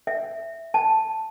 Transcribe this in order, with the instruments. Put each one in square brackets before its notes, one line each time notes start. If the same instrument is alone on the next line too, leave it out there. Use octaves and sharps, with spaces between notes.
[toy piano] E5
A5